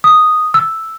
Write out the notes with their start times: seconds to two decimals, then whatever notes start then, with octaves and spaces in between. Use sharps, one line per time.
0.04 D#6
0.54 E6